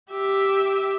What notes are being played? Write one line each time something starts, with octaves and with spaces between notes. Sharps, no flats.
G4 E5